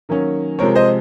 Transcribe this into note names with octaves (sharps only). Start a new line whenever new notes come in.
D#3 F#3 A#3 C#4
C3 F3 G#3 C4 A#4 C#5
C5 D#5